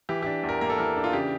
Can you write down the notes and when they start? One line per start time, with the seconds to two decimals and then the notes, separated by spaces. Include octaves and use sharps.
0.09 E3 G4
0.22 D4 G4
0.44 E2
0.49 A#4
0.61 A#3 A#4
0.70 A4
0.78 E3 A#4
0.96 D4
1.04 F4
1.13 C#3 G4